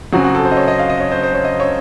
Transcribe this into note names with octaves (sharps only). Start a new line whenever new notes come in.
F#2 C#3 F#3 C4 F#4
F#4
A4
C5
D#5
C#5
D#5
F5
D#5
C#5
C5
C5
C#5
D#5
C#5